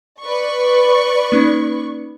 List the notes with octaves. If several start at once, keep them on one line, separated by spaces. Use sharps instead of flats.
B4 D5 C#6
A#3 C#4 D#4